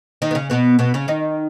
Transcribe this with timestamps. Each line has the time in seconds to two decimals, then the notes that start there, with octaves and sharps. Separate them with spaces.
0.22 D#3 D#4
0.31 B3
0.35 C#3 C#4
0.50 B2 B3
0.79 B2 B3
0.94 C#3 C#4
1.08 D#3 D#4